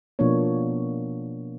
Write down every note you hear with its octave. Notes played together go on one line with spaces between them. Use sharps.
B2 F3 A#3 B3 D4 C#5